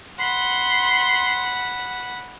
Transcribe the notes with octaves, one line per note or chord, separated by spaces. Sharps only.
F#5 B5 C6